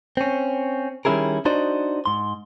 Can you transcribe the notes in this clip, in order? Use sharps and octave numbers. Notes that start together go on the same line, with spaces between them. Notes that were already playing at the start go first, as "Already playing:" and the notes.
C4 C#4
D#3 G3 C#4 E4 G#4 A#4
D4 D#4 F#4 C5 D5 D#5
G#2 C6